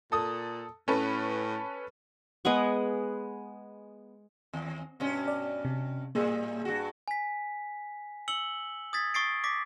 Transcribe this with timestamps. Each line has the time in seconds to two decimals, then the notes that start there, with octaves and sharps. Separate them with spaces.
0.12 A#2 A4 D#6
0.88 A2 C#4 A4 B4
2.45 G#3 B3 F#5 C#6
4.53 D#2
5.00 G2 B2 C#4
5.28 D5
5.65 C3
6.15 A2 G3 A#3 G#4
6.65 G2 F#4
7.08 G#5 B6
8.28 E6 C#7 F#7 G7
8.93 D#6 G#6 A6 B6
9.14 C#6 D#6 A6 C7 D7
9.44 D6 A#6 B6